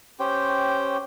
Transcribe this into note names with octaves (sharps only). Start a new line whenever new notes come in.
C#4 G4 C5 G5